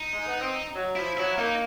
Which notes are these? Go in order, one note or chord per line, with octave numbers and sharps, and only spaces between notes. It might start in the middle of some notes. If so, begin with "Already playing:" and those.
Already playing: D#4
G#3
B3
C4
F#3
F3 E4
F#3 E4
A#3 D#4